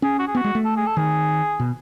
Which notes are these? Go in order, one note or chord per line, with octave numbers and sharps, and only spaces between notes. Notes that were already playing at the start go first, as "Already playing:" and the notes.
C#4 G#4
F#4
G#4
B3
F#4
G#3
A3
A4
G#4
A4
D#3 G#4
B2